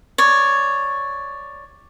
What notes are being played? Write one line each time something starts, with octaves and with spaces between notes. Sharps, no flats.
C#5 D5